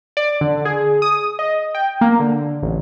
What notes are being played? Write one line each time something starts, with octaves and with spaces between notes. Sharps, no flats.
D5
D3
G#4
D#6
D#5
G5
A#3
D3
A1